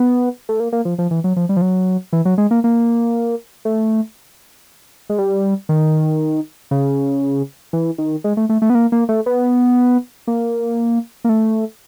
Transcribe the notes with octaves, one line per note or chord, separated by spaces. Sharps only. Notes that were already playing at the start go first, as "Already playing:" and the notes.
Already playing: B3
A3
A#3
A#3
F3
F3
E3
F#3
F3
G3
F3
F#3
E3
F#3
G#3
A#3
A#3
A3
G#3
G3
D#3
C#3
E3
D#3
G#3
A3
A3
A3
B3
A#3
A#3
A3
B3
A#3
A#3
A3